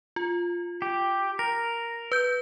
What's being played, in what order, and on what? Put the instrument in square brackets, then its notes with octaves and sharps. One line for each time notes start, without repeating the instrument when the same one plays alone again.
[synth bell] F4
[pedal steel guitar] G4
[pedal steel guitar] A#4 [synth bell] A#6
[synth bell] B4 G6